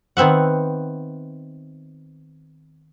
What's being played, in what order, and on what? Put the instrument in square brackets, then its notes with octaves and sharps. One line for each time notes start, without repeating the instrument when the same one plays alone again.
[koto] D#3 B3 C4 E5 F#5